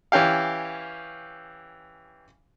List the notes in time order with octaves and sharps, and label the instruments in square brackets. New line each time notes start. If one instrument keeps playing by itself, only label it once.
[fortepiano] E3 C#4 G4 F5